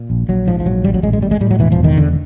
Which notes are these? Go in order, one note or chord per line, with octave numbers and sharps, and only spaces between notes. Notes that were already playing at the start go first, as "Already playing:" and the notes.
Already playing: A#2
A#1
A#1 F#3
G#2 F3
F3
A#1 F#3
A1 G3
F#3
A1 G#3
G#3
A2 G3
G#3
A2 G3
F#3
E1 E3
F3
E2
D#3
E1 D3